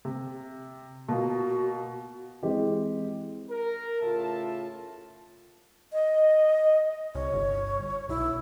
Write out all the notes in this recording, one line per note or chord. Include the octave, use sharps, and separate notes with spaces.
C3
B2 A#3 F4 F#4
E3 G#3 C4 G4 D#5
A#4
A2 C#3 A3 F4 E5 A5
D#5
C2 C#5
G1
B1 E4